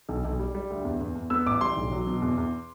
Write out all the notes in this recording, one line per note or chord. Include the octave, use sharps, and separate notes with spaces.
B1
B1
G3
G3
D2
E2
E2
E2
B3 E6
A1 D6
G3 C6
B1
F#3
B2
E2
E2